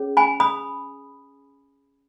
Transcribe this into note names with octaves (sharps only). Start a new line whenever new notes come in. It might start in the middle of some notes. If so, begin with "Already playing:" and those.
Already playing: C#4 G#4 C#5
G#5 B5
B5 D#6